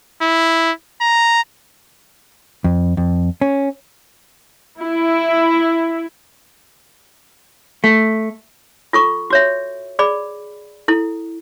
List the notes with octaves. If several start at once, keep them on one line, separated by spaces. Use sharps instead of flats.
E4
A#5
F2
F2
C#4
E4
A3
F4 A4 C#6
F#4 C#5 E5
G#4 D5 B5
E4 A4